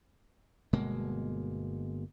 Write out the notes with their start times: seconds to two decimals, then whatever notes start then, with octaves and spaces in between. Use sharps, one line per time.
0.73 G1 B2 G#3 A#3